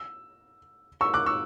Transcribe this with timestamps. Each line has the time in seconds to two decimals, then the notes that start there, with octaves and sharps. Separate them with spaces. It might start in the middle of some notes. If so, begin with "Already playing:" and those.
Already playing: E6
1.01 C#6 E6
1.14 D6 F#6
1.26 C#6 E6